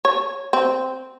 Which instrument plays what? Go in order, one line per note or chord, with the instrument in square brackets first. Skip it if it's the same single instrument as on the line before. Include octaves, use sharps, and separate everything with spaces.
[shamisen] C#5
C4